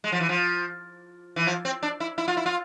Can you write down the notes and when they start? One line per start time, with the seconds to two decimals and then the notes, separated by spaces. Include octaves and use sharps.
0.04 G#3
0.12 F3
0.20 E3
0.29 F3
1.36 E3
1.47 F3
1.65 C4
1.83 D4
2.00 E4
2.18 E4
2.28 F4
2.37 E4
2.46 F4